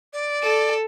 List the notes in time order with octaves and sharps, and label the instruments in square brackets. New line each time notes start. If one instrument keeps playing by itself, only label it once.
[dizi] D5
[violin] A4